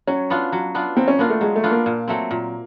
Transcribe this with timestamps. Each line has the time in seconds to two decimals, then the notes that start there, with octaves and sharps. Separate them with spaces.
0.07 F#3 C#4
0.30 B3 D4 F4
0.52 F#3
0.75 B3 D4 F4
0.97 F#3 C4
1.08 C#4
1.19 A#3 B3 D4 F4
1.30 A3
1.41 F#3 G#3
1.56 A3
1.63 B3 D4 F4
1.71 A#3
1.86 A#2
2.08 F#3 A3 C4
2.31 A#2